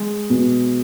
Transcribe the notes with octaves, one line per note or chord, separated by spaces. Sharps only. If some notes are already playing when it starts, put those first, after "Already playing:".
Already playing: G#3
B2